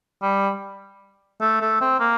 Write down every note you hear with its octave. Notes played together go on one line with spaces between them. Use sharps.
G3
A3
A3
C4
A#3